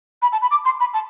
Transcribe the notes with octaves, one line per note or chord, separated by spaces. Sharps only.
B5
A5
B5
D6
C6
B5
A5